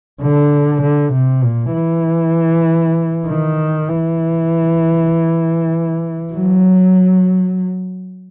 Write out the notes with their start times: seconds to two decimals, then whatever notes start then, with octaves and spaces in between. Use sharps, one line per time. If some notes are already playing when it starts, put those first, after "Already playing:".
0.21 D3
0.82 D3
1.13 C3
1.43 A#2
1.73 E3
3.27 D#3
3.88 E3
6.33 F#3